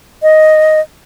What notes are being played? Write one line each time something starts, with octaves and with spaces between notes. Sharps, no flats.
D#5